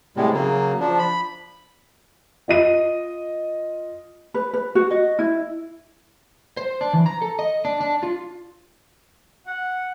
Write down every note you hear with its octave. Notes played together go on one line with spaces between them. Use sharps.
A2 C3 G3 G#3
C#3 F#3 A#3
F3 D4
B5
F4 D#5 D#7
B4
B4
F#4
D#5
E4
C5
D4
E3
A#5
A4
D#5
D4
D4
F4
F#5